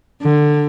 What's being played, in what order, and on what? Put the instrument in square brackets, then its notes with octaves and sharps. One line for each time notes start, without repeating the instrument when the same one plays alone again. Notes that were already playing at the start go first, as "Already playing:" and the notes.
[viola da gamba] D3